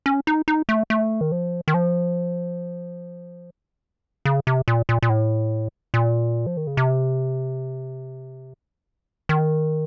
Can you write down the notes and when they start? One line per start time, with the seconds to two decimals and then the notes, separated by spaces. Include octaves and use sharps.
0.06 C#4
0.27 D#4
0.48 D#4
0.69 A3
0.90 A3
1.21 D#3
1.32 F3
1.68 D#3
1.74 F3
4.25 C#3
4.47 C3
4.68 A#2
4.89 A#2
5.03 A#2
5.10 A2
5.94 A#2
6.46 F3
6.57 D#3
6.67 C#3
6.77 C3
9.29 D#3